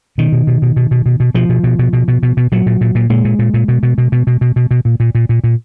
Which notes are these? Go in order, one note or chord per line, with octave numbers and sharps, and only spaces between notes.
B2 D#3
B2
B2
B2
B2
B2
B2
B2
B2 F3
B2
B2
B2
B2
B2
B2
B2
A#2 F#3
A#2
A#2
A#2
A#2 G#3
A#2
A#2
A#2
B2
B2
B2
B2
B2
B2
B2
B2
A#2
A#2
A#2
A#2
A#2